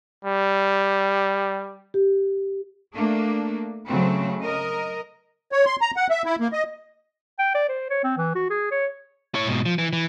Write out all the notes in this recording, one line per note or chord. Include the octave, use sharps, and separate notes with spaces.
G3
G4
A3 A#3 D4
C#3 F#3 A3 C4
A#4 D#5
C#5
C6
A#5
F#5
E5
E4
A#3
D#5
G5
D5
C5
C#5
C4
E3
F#4
G#4
C#5
E4 C#5
G#2 B2
F3
E3
E3